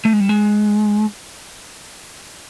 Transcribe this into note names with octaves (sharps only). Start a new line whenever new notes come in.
A3
G#3
G3
G#3